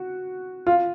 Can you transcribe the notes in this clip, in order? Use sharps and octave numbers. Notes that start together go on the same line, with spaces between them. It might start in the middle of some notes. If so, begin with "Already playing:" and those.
Already playing: F#4
F4